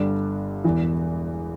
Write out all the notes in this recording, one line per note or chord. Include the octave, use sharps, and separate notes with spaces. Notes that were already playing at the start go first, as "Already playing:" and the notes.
Already playing: G1 G2 D3 G3 D4
E1 E2 E3